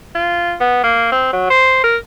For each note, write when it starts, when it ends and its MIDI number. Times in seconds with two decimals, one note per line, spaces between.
0.15 0.54 65
0.60 0.81 59
0.84 1.08 58
1.12 1.28 60
1.33 1.46 54
1.50 1.80 72
1.84 1.97 70